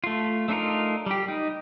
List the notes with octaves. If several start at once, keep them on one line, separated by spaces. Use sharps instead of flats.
A3 F4
A3 D4 D#4 F4 A#4
G3 G4
D#4